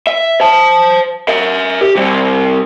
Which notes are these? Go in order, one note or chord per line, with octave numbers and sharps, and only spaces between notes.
E5
C5 A5
A#4 E5
G4
C3 G3